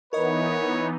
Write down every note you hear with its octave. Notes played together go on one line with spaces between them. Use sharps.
E3 B3 D#4 A#4 B4 C#5 D#5